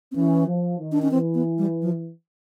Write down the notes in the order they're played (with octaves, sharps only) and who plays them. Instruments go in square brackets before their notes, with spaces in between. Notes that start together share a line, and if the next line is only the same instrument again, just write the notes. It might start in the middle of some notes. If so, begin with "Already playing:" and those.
[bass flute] C4
[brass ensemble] E3 [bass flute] C#4
[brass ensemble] F3
D#3
[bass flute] D4
C#4
[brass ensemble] E3 [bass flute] C4
[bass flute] B3
G3
F3